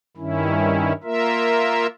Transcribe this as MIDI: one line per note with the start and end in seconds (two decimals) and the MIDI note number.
0.17 0.93 43
0.17 0.93 51
0.17 0.93 61
0.17 0.93 64
1.04 1.87 58
1.04 1.87 65
1.04 1.87 70
1.04 1.87 76